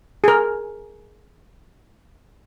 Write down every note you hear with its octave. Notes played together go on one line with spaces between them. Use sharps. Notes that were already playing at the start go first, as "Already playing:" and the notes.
G#4 A#4